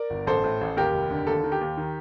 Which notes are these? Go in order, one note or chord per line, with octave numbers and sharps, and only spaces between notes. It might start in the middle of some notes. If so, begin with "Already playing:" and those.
Already playing: A#4 D5
G1
A1 A4 C5
A2
A1
D#2 G4 A#4
F1
D3
D#2 A4
D#3
G4
D#2
D#3